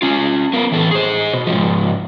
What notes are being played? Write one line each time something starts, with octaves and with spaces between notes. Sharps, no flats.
C#4 F4
B3 A#4
E3 A4 B4
G#4 C5
B2
G#2 F3